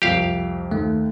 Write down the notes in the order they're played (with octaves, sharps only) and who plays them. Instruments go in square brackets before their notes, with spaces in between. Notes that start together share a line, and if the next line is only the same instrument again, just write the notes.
[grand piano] C2 F2 [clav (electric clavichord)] G4 F5
[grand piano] D#2 [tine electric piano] A3